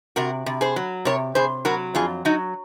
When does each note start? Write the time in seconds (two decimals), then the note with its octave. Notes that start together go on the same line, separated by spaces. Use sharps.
0.16 C3 F#4 A#4
0.46 C3
0.61 G#4 C5
0.76 F#3
1.05 C3 A#4 C#5
1.35 C3 G#4 C5
1.65 F#3 F#4 A#4
1.95 F2 F4 G#4
2.25 F#3 D#4 F#4